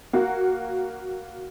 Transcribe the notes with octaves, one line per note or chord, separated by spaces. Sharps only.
A#3 F#4